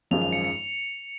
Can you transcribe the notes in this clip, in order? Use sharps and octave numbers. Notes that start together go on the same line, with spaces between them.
G#1 F#2 F3 G#3 F7
F7
C#7
C#7